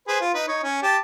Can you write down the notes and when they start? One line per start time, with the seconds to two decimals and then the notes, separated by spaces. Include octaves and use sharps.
0.08 G#4 B4 C5
0.21 F4
0.34 D#4 B4
0.48 D#4 C#5
0.63 C#4
0.82 G4 A5